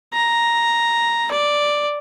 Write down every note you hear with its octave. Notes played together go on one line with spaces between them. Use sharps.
A#5
D5